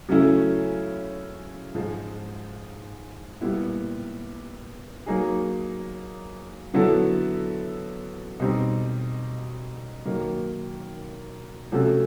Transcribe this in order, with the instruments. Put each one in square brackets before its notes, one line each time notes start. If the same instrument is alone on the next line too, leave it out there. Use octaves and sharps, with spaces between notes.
[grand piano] C#3 F#3 A3 C#4 E4
G#2 F3 G#3
A#2 G3 B3 E4
F#3 A#3 D#4 G#4
D3 F#3 B3 E4 A4
B2 G3 C4 D#4
D#3 F#3 A#3
C3 F3 A3 C#4 F#4